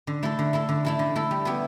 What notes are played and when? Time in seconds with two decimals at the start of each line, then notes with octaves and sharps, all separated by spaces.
0.07 D3
0.23 A3 E4 A4
0.39 D3
0.53 A3 E4 A4
0.69 D3
0.85 A3 E4 A4
0.99 D3
1.15 A3 E4 A4
1.31 G3
1.45 B3 E4 G4